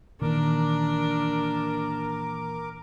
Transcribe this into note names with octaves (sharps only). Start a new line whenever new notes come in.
A#2 D#3 E3 A#3 D4 A#4 D6